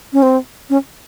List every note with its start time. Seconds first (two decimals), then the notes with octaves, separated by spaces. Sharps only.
0.13 C#4
0.22 C4
0.70 C#4